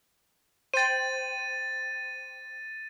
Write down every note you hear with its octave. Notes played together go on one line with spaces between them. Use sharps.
C5 G5 A6 D#7